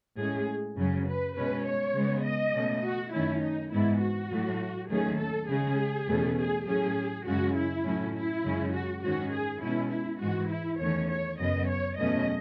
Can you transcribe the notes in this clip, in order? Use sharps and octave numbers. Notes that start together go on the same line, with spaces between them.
A2 G#3 C#4 G#4
F#2 C#3 F#3 C#4
B4
B2 G#3 C#4 B4
C#5
C#3 G#3 B3
D#5
B2 A3 C#4
F#4
F#2 D#3 A3 C#4 E4
D#4
G#2 E3 G#3 B3 E4
F#4
A2 F#3 A3
D#2 D#3 F#3 A3 C#4 G#4
A4
C#3 G#3 C#4 G#4
E2 B2 A3 C#4
G#4
A2 F#3 C#4 G#4
F#2 C#3 G#3 C#4 F#4
E4
A2 F#3 C#4
E4
F#2 C#3 G#3 C#4
F#4
G#2 D#3 G#3 C#4 F#4
G#4
B2 G#3 C#4 E4
E4
G#2 E3 G#3 F#4
E4
E2 D#3 A3 C#4 C#5
C#5
F#2 C#3 F#3 B3 D#5
C#5
E2 B2 F#3 A3 C#4 D#5